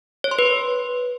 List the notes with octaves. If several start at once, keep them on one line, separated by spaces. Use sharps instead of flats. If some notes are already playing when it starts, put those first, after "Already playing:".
C#5
C6
B4